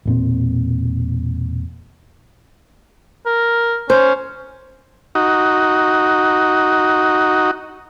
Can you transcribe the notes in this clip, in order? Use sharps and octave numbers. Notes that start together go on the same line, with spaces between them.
E1 A#2 C4
A#4
C#4 C5
D#4 F#4